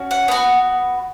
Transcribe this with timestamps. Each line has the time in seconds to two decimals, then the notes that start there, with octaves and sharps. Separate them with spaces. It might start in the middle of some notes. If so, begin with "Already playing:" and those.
Already playing: C#4 F#4
0.11 F#5
0.28 B3 F#4